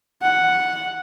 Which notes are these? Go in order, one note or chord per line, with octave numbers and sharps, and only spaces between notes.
F#5